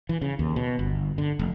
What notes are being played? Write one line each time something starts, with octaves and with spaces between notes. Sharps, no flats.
E3
C#3
D#2
B2
G1
D3
F1